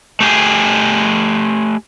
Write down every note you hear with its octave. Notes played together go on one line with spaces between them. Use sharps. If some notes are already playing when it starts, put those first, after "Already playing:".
A3 G4 G#4